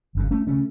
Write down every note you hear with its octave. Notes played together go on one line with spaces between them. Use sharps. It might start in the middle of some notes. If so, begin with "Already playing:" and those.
G1 F#2 C#3
A3 C#4
C#3 A3 C#4